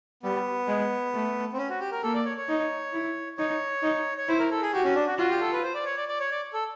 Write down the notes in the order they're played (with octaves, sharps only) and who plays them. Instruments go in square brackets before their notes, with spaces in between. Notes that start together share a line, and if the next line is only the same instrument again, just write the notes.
[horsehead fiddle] G3 [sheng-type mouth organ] B3
[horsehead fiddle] G#3
A3
[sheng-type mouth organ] C4
C#4
F#4
G4
A#4
[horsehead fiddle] A#3 [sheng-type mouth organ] A4
[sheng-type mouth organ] D5
C#5
C#5
[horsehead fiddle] D#4
E4
[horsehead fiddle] D#4 [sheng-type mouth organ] C#5
[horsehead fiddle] D#4
[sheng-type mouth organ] C#5
[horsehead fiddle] E4 [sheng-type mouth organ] C5
[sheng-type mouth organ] A#4
A4
G#4
[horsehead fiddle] F#4 [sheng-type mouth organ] G4
[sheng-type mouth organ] C#4
D4
F#4
[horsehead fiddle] F4 [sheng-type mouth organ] F#4
[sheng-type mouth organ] G4
A4
B4
C5
D5
C#5
D5
D5
C#5
D5
A4